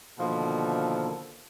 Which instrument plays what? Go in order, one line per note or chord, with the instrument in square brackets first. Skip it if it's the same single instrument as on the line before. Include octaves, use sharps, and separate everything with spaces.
[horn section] B2 D3 D#3 F3 A#3 A4